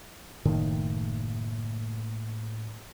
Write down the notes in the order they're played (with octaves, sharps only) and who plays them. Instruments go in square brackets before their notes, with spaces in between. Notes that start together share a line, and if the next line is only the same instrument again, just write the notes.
[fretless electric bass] F#1 D#3 [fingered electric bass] A2 A3 A#3